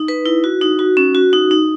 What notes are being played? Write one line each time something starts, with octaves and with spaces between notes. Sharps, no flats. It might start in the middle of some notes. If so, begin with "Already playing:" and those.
Already playing: D#4
B4
E4
F#4
D#4
F#4
C#4
F#4
D#4
D#4